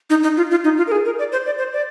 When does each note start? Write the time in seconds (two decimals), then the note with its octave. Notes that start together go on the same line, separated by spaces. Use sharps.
0.10 D#4
0.23 D#4
0.37 F4
0.50 F4
0.65 D#4
0.77 F4
0.87 A#4
0.92 G#4
1.05 A#4
1.19 D5
1.32 C5
1.46 D5
1.58 C5
1.73 D5